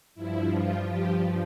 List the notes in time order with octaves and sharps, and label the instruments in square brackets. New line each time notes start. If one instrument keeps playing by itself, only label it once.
[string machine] G2 F3 E4
F4
G4